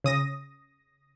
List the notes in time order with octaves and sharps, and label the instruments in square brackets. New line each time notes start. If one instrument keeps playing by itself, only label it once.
[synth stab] C#3 D#6 A#6